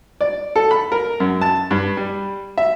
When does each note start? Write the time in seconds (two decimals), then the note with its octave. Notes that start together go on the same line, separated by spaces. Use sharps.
0.21 D5
0.56 A4
0.71 B5
0.92 A#4
1.20 F#2
1.41 A5
1.71 G2
1.97 G3
2.58 E5